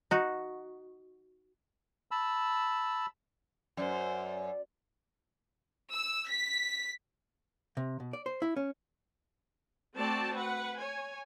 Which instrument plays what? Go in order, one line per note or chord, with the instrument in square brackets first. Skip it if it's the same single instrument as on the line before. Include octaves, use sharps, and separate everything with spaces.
[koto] D#4 F#4
[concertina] A5 B5 E6
[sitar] F#2 [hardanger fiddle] C5 [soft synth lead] D5
[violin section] E6
B6
[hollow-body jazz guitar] C3
B2
D5
C5
E4
C#4
[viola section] A3 C4 F#4 D5 A5
B4 F#5
C#5 G#5